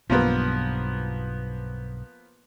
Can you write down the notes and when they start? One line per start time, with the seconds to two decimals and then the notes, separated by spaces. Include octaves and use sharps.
0.10 B1 G2 F3 A#3 B3